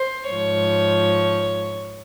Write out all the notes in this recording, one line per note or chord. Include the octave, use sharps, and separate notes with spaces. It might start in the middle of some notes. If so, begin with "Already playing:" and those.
Already playing: C5
G#2 F3 C#5